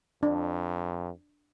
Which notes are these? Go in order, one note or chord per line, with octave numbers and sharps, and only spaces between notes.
F2 D4